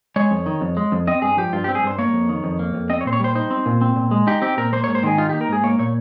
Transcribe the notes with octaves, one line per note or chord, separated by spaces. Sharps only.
G#3 C#5
F2
D#3
F2
G#3
F2
C4 D#5
G2 G#4
F3 G4
G2 F4
C4 G4
G#4
G2 C5
A#3 C#5
F2
D#3
F2
A#3
F2
C4 D#5
C#5
A#2 C5
C#5
G3 C5
D#4 C5
C4
A#2
C4
A#2
G#3
D#4 G4
C4 G4
A#2 A#4
A#3 C5
G#2 C#5
C5
D#3 G#4
D#4 F4
A#3 G4
A#4
G#2 G#4
A#3 C#5
A#2 C#5